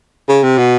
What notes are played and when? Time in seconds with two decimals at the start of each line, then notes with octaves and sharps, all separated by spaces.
0.28 C#3
0.43 C3
0.58 B2